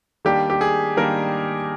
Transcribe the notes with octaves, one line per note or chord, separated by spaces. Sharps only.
D#3 G3 A#3 D4 G4
G4
G#4
D#3 G3 A#3 D4 A#4